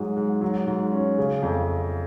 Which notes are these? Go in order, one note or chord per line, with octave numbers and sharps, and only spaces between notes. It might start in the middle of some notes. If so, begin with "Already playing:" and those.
Already playing: G#2 F#3 G#4
G#2
F#3
G#2
C#4
C#3
F2